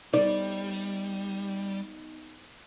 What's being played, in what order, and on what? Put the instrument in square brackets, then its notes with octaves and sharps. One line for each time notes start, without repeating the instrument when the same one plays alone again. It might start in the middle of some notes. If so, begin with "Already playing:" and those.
[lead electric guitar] G3 [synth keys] B3 D#4 [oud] D5